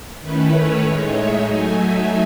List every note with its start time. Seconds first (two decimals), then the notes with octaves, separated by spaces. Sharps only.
0.21 D#3 A3 C#4 E4 B4
0.51 C#5
0.80 A2 G#3 D#4 C#5
1.10 E5
1.40 F#3 A3 D#4 G#5
1.70 E5